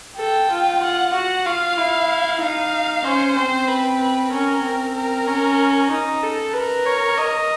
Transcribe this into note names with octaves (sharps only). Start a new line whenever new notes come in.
A4 G5
F4
F4 F#5
F#4 F#5
F4 F5
E4
D#4 F5
C#4 C5
C4 C5
B4
B4
C#4 A#4
C4
A#4
C#4
D#4
A4
A#4 B4
C#5
D#5